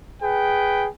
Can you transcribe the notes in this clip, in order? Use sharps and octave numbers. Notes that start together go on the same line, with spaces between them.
G#4 B4 G5